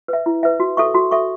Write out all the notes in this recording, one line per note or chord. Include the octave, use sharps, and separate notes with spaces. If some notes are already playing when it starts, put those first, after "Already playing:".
B4 E5
E4
B4 E5
F#4
A4 E5 C#6
F#4
A4 E5 C#6